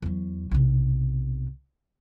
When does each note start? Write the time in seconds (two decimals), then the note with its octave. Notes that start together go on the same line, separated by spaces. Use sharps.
0.02 E2 F#3
0.51 B1 C3